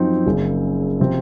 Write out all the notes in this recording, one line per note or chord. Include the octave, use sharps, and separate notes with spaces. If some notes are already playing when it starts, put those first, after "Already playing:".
Already playing: F#2 F3 C4 D#4 F#4
F#1 F#2 C#3
C3 F3 C4